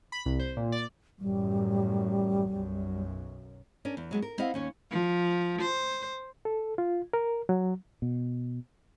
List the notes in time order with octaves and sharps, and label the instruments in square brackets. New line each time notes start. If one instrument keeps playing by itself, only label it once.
[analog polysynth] B5
C2
C5
A#2
D5
[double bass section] A1 F#2 [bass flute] G3
[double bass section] B1 F#2
[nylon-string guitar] C#4 D4 A#4
E2
F#3 G#3 B3
A#4
B3 C4 E4 D#5 F5 F#5
D#2 C#4 C#5
[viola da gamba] F3
C5
[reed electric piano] A4
F4
A#4
F#3
[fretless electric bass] B2